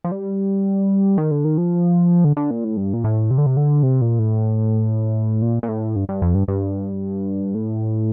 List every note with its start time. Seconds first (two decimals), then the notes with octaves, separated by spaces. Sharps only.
0.04 F3
0.11 G3
1.18 D#3
1.31 D3
1.45 D#3
1.58 F3
2.25 D3
2.37 D3
2.51 A#2
2.64 A2
2.77 G2
2.94 A#2
3.04 A2
3.31 C3
3.38 D3
3.46 C3
3.57 D3
3.83 C3
4.01 A#2
4.19 A2
5.42 A#2
5.63 A#2
5.69 A2
5.96 G2
6.09 G2
6.22 F2
6.35 G2
6.48 G2
7.55 A2